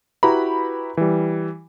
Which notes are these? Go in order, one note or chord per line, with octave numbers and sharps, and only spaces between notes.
E4 F#4 G4 B4 A#5 B5
E3 G3